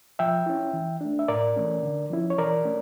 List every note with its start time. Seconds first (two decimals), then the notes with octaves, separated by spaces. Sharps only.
0.19 F3 E5 G5
0.46 C#4 E4
0.73 E3
1.01 A3 D4
1.19 E5
1.28 A2 A#4 D5
1.56 E3 A3 C#4
1.83 D3
2.10 F3 C#4 E4
2.30 C#5
2.38 E3 A#4 D5
2.65 A3 C#4